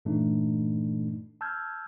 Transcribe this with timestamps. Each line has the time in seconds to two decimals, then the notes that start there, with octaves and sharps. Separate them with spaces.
0.05 G2 A#2 E3 A3 D4 D#4
1.41 A5 E6 F6 G6 G#6